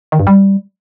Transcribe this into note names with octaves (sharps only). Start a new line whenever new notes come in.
D#3
G2
G3